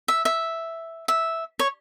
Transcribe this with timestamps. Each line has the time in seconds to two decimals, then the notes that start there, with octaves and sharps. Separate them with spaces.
0.08 E5
0.25 E5
1.08 E5
1.59 C#5